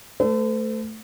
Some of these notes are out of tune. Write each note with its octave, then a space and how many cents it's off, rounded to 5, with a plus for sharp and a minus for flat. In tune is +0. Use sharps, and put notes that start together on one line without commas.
A3 +0 A4 +15 C5 -45